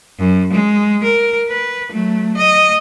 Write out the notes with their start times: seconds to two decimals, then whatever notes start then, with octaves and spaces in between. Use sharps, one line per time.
0.19 F#2
0.53 G#3
1.03 A#4
1.49 B4
1.90 F#3 A3
2.37 D#5